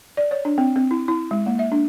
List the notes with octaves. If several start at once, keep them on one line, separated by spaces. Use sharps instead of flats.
D5
C#5
D4
C4
C4
E4
E4
G#3
A#3
E5
D4